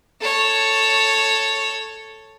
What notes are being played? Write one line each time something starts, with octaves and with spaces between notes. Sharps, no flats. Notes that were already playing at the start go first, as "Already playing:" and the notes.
A4 C#5